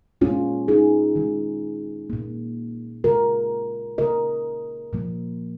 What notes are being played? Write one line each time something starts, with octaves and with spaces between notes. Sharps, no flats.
A#2 G#3 C#4 F4
D#4 G#4
D#3 G#3
A#2 A#3
C#3 G#3 F4 A#4
C#3 A#3 A#4 D#5
A#2 F3 A#3